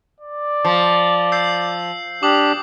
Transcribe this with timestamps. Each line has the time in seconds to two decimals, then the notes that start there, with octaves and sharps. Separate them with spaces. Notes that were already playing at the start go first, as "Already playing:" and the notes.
0.21 D5
0.65 F3
1.32 E6 G6 C7
2.23 D4 G4 D6 D#6 F#7